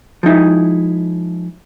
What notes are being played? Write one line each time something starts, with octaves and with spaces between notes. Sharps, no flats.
F3 G#3 D#4 E4